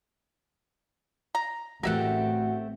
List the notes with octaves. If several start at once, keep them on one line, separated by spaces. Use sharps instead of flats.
A#5
A1 A3 C4 F#4 G4 A#4 E5 F#5